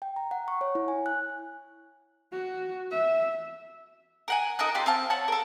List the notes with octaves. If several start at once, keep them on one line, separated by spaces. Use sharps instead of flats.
G5
A#5
F#5
C#6
C#5
E4
G#5
F#6
F#4
E5
A#4 F#5 G#5
D#4 A4 A#4 F#6
C4 F4 G4 C6
C4 F5 A5
C#5 F#5 A5
A4 A#4